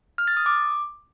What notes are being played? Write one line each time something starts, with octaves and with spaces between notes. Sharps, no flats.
F6
A6
D#6
D6